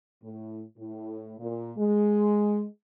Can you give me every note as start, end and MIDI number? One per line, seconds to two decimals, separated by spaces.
0.23 0.63 45
0.78 1.34 45
1.39 1.72 46
1.78 2.65 56